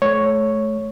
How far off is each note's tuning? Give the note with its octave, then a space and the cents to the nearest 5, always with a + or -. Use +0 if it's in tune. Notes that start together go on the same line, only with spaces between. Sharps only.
A3 -30 C#5 +0